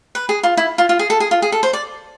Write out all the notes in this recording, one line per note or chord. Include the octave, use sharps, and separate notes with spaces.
B4
G#4
F4
E4
F4
F4
G#4
A4
G#4
F4
G#4
A4
C5
D5